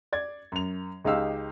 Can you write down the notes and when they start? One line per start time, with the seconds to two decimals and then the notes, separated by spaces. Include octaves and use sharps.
0.13 D5 G#6 A6
0.52 F#2 F7
1.04 C#2 G#3 D#4 G4 F5 E6